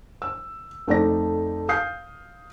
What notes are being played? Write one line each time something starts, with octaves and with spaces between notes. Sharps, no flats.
E6
F2 A3 D#4 D5 A#6
F5 D#6 G6 C7